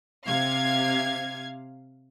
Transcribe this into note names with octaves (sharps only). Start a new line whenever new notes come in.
C3 F5 G#6